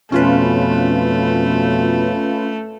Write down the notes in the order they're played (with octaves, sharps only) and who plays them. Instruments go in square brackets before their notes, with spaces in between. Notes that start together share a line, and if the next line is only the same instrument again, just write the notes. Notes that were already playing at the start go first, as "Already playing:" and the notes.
[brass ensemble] F2 B2 [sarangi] A3 [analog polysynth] C#4 F4 B4